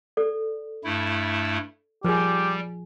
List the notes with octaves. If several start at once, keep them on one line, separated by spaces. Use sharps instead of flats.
A4 D5
G2 A3 E4
F3 G3 G4 G#4